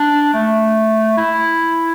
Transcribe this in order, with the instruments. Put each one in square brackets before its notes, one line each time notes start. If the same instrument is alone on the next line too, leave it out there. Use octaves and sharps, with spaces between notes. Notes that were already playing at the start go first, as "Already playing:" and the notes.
Already playing: [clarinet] D4
A3
E4